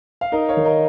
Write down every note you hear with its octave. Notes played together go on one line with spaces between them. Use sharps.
F5
D#4 A#4 D#5
C#5 F5
D#3
A#4 D#5